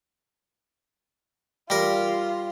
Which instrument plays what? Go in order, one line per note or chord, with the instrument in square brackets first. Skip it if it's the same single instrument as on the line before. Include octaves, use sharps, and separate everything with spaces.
[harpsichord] G3 A#4 [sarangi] F4